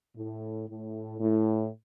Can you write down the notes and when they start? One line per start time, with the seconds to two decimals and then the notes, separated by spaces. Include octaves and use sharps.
0.16 A2
0.69 A2
1.19 A2